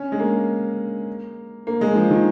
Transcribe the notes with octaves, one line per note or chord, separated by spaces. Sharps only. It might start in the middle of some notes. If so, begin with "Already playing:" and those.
Already playing: C#4
G#3
A#3
A#3
G#3
F3
D#3